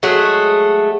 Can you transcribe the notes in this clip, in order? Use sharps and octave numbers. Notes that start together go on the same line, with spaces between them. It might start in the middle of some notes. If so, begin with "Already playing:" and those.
F#3 G#3 A3 G#4